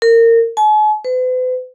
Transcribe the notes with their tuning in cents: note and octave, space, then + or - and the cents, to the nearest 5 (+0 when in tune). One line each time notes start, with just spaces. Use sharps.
A#4 -25
G#5 +45
B4 +45